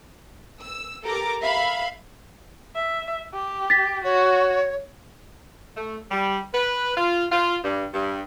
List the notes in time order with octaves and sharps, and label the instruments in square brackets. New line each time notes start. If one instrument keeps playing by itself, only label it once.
[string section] E6
G4 A4 A#4 A#5 D6
E5 F5 B5
[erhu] E5
G4
[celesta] A6 B6
[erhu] F#4 [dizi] C#5
[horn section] A3
G3
B4
F4
F4
G2
G2